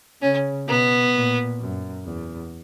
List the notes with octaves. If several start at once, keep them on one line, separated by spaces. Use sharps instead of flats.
C#3 C#4
B2 B3
A#2
F#2
E2